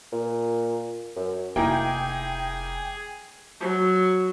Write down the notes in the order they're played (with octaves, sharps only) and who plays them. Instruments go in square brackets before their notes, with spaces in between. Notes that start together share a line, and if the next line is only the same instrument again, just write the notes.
[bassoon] A#2
F#2
[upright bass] F1 [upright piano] A#3 D#4 E4 [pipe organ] G#4 [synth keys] G5 G#5
[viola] F#3